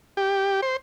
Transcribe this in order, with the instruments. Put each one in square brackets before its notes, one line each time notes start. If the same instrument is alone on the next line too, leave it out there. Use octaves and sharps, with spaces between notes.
[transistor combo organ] G4
C5